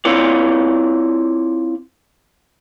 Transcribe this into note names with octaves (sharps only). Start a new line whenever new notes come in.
C4 E4 F4 C#5 D5